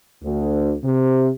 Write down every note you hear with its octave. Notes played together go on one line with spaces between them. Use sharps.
D2
C3